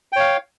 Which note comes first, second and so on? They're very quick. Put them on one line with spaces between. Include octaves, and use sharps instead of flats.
G5 C#5 F5